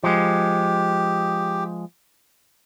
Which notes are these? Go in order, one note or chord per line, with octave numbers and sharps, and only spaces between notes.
F3 G#3 G4